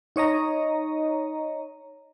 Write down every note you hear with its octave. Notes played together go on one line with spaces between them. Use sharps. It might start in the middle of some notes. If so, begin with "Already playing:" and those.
D#4 C#5 D#5 A#5